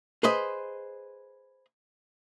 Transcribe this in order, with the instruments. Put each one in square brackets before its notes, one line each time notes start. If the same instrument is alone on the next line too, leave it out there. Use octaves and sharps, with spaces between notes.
[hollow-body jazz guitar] G#4 B4 C5 D#5